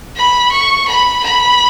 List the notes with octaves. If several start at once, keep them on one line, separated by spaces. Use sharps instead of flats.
B5
C#6
B5
B5